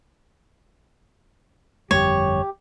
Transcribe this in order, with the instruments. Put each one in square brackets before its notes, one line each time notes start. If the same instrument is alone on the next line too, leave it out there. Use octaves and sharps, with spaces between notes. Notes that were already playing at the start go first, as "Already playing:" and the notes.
[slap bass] G1 F2 G3 [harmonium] G4 [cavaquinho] C#5